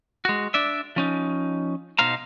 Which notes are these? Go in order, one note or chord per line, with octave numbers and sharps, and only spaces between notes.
G#3 F#4
D4 D5 E5
F3 C#4 D#4
B2 D#4 C5 F5 A#5